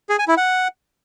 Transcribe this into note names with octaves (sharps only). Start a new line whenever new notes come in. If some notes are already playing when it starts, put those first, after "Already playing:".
G#4
G#5
E4
F#5